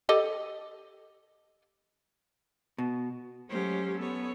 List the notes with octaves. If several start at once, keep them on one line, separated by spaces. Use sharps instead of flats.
G4 A4 D#5
B2
F#3 G#3 A3 C#4 G4 C5
B3 A4 C#5